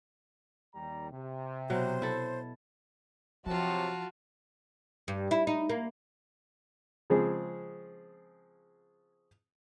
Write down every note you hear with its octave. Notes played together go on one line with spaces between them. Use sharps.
D#2 G3 A#5
C3
B2 F#3 C5
E4 A4
C3 F3 F#3 F4 F#4 A5
G2
E4
D#4
A#3
C#3 F3 G#3 C4 G#4